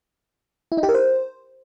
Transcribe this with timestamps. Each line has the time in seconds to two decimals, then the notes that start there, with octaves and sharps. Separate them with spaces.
0.72 E4
0.77 D#4
0.83 G4
0.89 A#4
0.94 C5